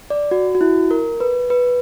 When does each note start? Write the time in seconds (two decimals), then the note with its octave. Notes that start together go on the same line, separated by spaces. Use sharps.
0.10 D5
0.31 F#4
0.55 F#4
0.61 E4
0.91 A#4
1.20 B4
1.50 B4